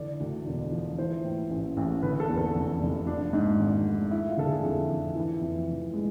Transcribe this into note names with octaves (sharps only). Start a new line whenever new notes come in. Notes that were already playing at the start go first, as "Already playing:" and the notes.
Already playing: D3 E3 D5
D2
E1
F3
E3 C5
A2
A1
A1
D3 B4
A4
E2
A4
F1
F1
F3 D4
G#2
G#1
A3
A3 E4
F4
D3 A4
G#4
F2 E4
F2
E3
F2
F1
G#3